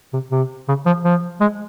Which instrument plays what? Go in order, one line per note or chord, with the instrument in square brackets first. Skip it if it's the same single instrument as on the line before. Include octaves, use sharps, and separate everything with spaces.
[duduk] C3
C3
C#3
F3
F3
G#3